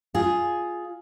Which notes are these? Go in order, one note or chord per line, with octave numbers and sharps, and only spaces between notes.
F4 G#4